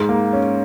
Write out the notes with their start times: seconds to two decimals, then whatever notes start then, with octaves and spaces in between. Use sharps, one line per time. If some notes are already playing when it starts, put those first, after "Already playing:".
Already playing: G#2
0.09 A#3
0.33 C#4